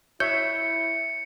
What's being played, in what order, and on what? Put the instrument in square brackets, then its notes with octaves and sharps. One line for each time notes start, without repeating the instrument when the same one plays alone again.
[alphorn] E4 [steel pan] C#5 E5 [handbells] G6 [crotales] C#7